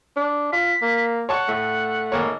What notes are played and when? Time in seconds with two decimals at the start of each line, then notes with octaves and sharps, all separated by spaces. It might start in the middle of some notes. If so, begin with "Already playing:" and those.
0.16 D4
0.53 F4 B6
0.82 A#3
1.29 C#5 F#5 A5 C#6
1.49 A2 A3
2.12 G#1 A#3 C#5